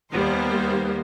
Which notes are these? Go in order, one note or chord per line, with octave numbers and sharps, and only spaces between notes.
D#2 G3 A#3 B3 C5